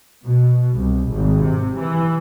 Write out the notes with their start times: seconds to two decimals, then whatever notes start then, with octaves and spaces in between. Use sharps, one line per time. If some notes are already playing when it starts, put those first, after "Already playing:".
0.24 B2
0.75 C2
1.09 G#1
1.44 C3
1.76 E3